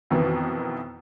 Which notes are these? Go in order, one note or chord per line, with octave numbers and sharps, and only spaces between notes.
F2 B2 D#3 E3 B3